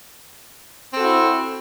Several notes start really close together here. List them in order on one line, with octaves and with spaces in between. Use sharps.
C4 A4 F#4 E4